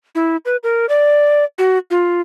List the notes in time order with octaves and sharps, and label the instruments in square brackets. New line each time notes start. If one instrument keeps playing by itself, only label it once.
[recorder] E4
B4
A#4
D5
F#4
F4